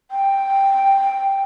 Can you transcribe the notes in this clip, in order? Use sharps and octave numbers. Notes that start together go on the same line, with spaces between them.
G5